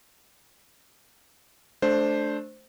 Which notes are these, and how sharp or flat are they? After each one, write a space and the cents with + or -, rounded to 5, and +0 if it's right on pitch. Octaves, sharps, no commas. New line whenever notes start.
A3 -20 D4 +0 C5 +0